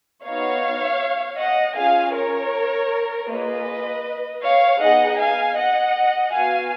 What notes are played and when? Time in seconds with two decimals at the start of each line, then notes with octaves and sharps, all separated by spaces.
0.24 B3 D#4 F#4 C#5 F5
1.39 D#5 F#5
1.76 C#4 F4 G#4 F5 G#5
2.14 A#4 C#5
3.28 A#3 F4 G#4 B4 D#5
4.42 C#5 F5
4.80 B3 D#4 G#4 D#5 F#5
5.19 F5 G#5
5.57 D#5 F#5
6.32 B3 F#4 F5 G#5